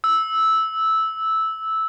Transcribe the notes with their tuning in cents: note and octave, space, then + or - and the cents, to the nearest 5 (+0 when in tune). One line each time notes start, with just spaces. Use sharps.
E6 -10